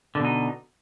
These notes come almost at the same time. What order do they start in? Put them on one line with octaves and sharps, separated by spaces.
D3 B2 D#4